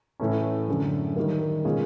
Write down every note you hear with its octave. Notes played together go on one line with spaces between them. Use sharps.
A2 E3 A3 C#4
F#2 D3 F#3
D#3 G3 A#3
B2 G#3 C#4 F4 G#4